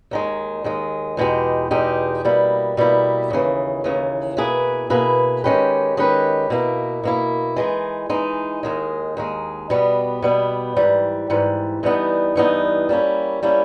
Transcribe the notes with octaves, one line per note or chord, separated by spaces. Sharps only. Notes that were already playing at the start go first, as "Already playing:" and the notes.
D#2 D#3 G#3
D#2 D#3 G#3
E2 B2 G#3 D#4 G4
E2 B2 G#3 D#4 G4
B2 G3 A#3 E4
B2 G3 A#3 E4
D#2 C#3 E3
D#2 C#3 E3
B2 A#3 E4 G#4 B4
B2 A#3 E4 G#4 B4
D#3 G#3 C#4 G4 B4
D#3 G#3 C#4 G4 B4
B2 A#3 E4
B2 A#3 E4
E3 G#3 D#4
E3 G#3 D#4
D#2 D#3 G#3
D#2 D#3 G#3
B2 G3 B3
B2 G3 B3
G#2 E3 G3
G#2 E3 G3
G2 E3 G3 B3 D#4
G2 E3 G3 B3 D#4
G3 A#3 C#4 E4
G3 A#3 C#4 E4